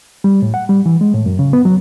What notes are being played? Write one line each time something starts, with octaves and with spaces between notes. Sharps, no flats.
G3
A2
F#5
G3
E3
G#3
A2
F#2
C#3
B3
F#3